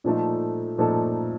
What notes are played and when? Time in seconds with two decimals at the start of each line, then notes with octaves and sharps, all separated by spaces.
0.04 A#2 F3 A3 D#4 A4
0.78 A#2 F3 A3 D#4 A4